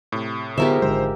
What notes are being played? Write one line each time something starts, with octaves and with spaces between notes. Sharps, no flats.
A2 C3
G#2 D3 F3 A#3 B3 G4 A#4 E5
G#1 D3 G#3 C5